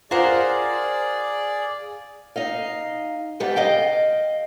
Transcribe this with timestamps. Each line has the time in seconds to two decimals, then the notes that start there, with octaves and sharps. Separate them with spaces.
0.11 F4 G#4 A#4 C5 D5 F#5
2.36 D#4 D#5 F5
3.40 G#2 C3 G3 B3 G4
3.56 D#5 F5 G5